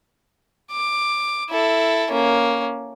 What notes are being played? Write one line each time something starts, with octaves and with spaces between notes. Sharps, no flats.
D6
E4 A4
A#3 C#4